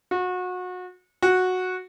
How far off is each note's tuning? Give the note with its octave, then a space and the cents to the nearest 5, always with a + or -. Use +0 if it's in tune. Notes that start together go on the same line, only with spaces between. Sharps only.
F#4 -30
F#4 -10